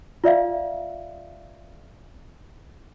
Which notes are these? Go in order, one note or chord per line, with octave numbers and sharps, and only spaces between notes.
F4 D5 E5 F5